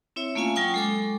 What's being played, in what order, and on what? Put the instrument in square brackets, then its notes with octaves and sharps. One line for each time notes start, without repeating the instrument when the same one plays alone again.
[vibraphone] C4 E4 C#5 E5
A3 A#3 C#4 F4 F5 G#5
F#3 F4 G5 C#6 D#6
G#3 A4 D6